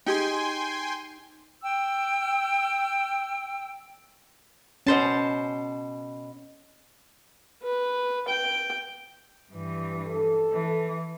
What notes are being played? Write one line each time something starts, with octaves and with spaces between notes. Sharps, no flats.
D#4 G4 G#4 G5 G#5 C6
G5 E6
B2 C#4 C5 A5
B4
G5
G2 E3
A4
E3